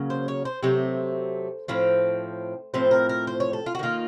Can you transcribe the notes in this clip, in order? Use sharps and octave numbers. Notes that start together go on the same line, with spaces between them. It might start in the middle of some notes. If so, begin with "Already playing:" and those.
Already playing: C#3 F#3 A#3
C5
C#5
C5
C3 F#3 A3 C5
A2 F3 C4
A2 F3 C4 C5
A#4
A#4
C5
C#5
A4
F4
F#4
D#3 A#3 F4